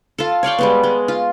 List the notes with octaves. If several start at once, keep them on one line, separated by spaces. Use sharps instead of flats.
F4 A4
C#5 D5 F5 G5
G3 G#3 B3
G#3
F4